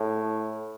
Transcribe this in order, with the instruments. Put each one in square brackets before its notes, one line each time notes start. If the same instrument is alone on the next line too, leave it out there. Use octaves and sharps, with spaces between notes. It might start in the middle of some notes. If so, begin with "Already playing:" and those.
Already playing: [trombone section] A2